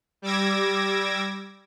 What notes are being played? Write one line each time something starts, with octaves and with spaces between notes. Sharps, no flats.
G3 D6 E6 G#6 A#6